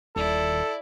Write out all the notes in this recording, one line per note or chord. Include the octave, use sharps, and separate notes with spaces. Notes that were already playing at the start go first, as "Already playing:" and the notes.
D#1 E4 A4 D5